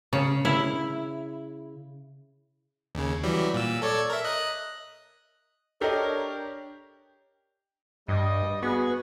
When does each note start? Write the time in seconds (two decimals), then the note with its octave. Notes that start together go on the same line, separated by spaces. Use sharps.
0.13 C#3
0.45 E4
2.95 D#2 C#3
3.23 E3 F#3 G3
3.54 A#2 E6
3.82 A4 C#5 D5
4.10 A#4 E5
4.24 D#5 F#6
5.81 D4 G4 A4 A#4 C#5 D#5 A#5
8.08 G2 G3 D#5
8.63 B3 F#4 G#4